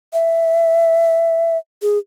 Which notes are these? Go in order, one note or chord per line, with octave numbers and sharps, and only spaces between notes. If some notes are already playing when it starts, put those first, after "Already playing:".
E5
G#4